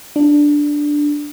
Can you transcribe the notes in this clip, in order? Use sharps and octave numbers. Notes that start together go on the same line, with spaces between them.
D4